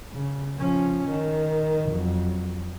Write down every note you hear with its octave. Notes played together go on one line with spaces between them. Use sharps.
C#3
F3 C#4
D#3
F2 F#3